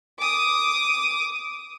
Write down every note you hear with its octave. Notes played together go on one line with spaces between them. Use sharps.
D6 D#6